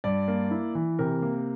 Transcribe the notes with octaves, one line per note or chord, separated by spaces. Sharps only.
G2 D5
A#3
E4
E3
C3 A#4
A#3